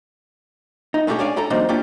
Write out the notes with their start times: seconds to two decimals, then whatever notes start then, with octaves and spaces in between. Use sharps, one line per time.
0.94 D#4
1.07 G#3 A3 C#4 D4 G4 G#4
1.19 C#4 D4 C#5 D5 F5 G#5
1.36 C#4 E4 A4 A#5
1.50 E3 F#3 A#3 C4 D4 D#4
1.69 A#3 C#4 D4 F4 G4